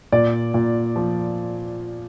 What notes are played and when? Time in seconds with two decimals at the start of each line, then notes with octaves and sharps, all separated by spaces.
0.12 A#2 D5
0.54 A#2
0.96 F3